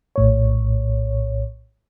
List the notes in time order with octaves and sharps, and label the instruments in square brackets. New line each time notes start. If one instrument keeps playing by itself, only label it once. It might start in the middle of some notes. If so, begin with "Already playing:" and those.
[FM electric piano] A#1 A2 C#5